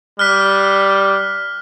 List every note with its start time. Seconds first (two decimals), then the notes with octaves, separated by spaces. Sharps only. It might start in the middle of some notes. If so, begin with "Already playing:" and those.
0.19 G3 F6 F#6 B6